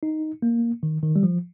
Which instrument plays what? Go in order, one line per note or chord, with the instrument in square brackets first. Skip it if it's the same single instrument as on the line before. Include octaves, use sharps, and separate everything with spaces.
[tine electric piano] D#4
A#3
D#3
D#3
G3
F3